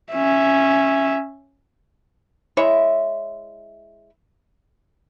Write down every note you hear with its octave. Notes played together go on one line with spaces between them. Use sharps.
C#4 E5
G#3 E4 C#5 E5